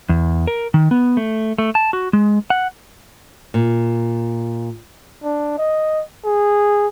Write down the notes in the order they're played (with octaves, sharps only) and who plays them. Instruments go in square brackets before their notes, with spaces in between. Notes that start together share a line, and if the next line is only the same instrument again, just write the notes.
[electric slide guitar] E2
A#4
D#3
B3
A3
A3
A5
F#4
G#3
F#5
[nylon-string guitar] A#2
[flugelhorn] D4
D#5
G#4